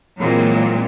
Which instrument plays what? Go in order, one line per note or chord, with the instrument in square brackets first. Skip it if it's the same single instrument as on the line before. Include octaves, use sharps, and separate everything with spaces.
[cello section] A#2 E3 F#3 G#3 A#3 C4